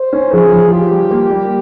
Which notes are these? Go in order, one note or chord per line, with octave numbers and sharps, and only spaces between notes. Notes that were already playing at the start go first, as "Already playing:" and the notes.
Already playing: C5
C#4
F3 G#4
F3
F4 G4
G3
A#3
G3